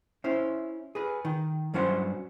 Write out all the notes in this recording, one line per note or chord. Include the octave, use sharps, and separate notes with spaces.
C#4 E4 C5
G#4 B4
D#3
G2 F#3 C#4 C5 F#5